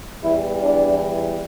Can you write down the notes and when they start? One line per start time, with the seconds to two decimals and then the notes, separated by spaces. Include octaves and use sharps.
0.23 E2 E3 G3 E4
0.62 D4